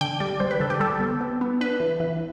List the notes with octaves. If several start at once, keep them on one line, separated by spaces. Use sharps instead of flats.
D3 G5
G3 D5
G3 C5
B4
D3 A4
G4
G3 A4
B3
B3
B3
D4 B4
E3
E3